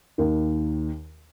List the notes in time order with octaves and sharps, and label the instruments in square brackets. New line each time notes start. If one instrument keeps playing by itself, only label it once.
[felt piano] D#2 D#3